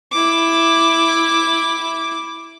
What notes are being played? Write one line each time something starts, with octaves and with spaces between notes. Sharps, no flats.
E4 D6